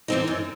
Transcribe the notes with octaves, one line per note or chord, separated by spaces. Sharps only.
E3 G#3 C4 D#4
F#2